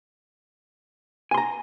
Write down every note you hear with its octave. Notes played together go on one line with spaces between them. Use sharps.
G#5 A#5 C6